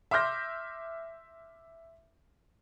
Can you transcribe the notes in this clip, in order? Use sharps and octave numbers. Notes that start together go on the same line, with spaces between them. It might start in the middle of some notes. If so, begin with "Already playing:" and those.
E5 C6 D6 F6 G6 A#6